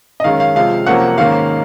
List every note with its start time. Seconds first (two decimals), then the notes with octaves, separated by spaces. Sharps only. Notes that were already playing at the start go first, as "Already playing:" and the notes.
0.20 D#5
0.24 F#2 D#3 G#3 C#4 F5
0.40 F5
0.56 C3 F3 G#3 F5
0.86 F2 C3 F#3 A#3 C#4 F#5
1.18 G#2 D#3 A#3 C#4 F5